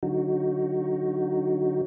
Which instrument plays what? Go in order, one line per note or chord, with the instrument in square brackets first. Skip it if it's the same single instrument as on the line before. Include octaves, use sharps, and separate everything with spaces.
[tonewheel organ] D3 F#3 D#4 F#4